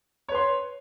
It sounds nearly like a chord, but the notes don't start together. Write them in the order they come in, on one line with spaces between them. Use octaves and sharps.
C#5 B4 C6